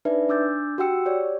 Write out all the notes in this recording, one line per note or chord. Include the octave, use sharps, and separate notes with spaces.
D4 D#4 B4 D5 E5
D4 D6 E6 G6 A6
F#4 G4 F#5 G5 E6 C#7
G4 C#5 D5